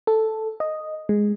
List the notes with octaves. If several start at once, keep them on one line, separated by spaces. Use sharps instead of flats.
A4
D#5
G#3